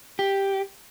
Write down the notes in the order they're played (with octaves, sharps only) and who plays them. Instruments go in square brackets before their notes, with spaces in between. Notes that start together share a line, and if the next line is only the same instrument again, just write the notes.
[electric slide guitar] G4